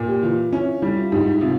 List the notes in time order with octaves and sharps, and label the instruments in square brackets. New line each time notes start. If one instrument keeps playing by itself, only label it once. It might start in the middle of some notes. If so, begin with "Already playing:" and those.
Already playing: [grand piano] A#2
[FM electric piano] G4
[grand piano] E3 [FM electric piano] F4
[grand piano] C#4 [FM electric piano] E4
[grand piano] G3 [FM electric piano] E4
[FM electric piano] F4
[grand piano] G#2 [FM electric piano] G4
[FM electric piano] E4
[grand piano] C3 [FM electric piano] F4